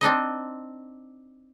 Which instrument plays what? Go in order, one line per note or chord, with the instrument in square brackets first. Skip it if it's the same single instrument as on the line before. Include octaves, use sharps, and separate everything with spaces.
[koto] C4 D4 D#4 D#5